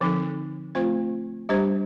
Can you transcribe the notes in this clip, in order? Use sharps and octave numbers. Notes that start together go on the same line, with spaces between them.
D3 F3 C4 D#4 A4
F3 A3 C4 F4 C5
G3 D4 G4 C5